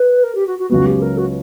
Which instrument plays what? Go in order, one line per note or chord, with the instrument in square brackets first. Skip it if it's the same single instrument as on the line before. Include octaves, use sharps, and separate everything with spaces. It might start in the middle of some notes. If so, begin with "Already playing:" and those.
Already playing: [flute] B4
A#4
G4
F#4
F#4
[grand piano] C#2 C#3 F#3 B3 [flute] F#4
[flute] G4
A#4
F#4